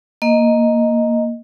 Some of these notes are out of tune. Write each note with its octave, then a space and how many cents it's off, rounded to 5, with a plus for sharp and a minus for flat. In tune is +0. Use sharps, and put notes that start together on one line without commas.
A#3 +0 D#5 +0